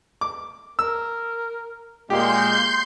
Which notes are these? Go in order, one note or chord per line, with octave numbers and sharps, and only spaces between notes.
D6
A#4 E6
A#2 G#3 A#3 G4 C6 G6